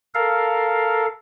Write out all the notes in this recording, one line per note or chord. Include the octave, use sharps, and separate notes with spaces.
A4 A#4 F5